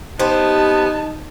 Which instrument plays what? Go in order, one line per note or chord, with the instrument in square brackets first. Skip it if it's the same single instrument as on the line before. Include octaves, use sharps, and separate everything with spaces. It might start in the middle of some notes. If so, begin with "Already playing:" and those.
[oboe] B3 [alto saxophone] D#4 [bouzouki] G4 C5 [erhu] A5